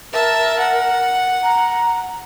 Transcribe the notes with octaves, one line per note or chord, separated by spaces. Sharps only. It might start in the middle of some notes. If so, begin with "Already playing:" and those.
A#4 E5 A5
F#5
A#5